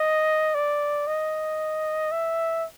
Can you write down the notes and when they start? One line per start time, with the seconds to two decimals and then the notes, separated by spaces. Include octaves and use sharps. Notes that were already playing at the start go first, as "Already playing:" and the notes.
Already playing: D#5
0.55 D5
1.07 D#5
2.12 E5